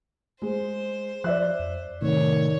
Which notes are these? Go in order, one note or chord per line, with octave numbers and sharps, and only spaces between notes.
G#3 C5
F3 D5 E5 F#6
F2
A2 C3 D#3 A3 C#5